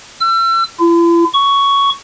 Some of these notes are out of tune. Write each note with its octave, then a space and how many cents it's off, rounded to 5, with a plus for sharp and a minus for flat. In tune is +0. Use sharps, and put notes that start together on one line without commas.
E6 +40
E4 +45
C#6 +10